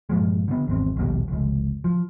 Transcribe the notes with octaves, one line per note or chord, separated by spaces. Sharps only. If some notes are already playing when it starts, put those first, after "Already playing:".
G2 A#2 F3 G#3
D3 B3
G#1 E2 C4
A#1 D#2 B2 G3
F1 C#2
F3